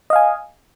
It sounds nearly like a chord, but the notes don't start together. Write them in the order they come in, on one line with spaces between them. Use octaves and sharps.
D#5 F5 G#5